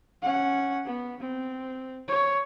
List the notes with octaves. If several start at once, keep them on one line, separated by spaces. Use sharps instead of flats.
C#4 F#5
B3
C4
C#5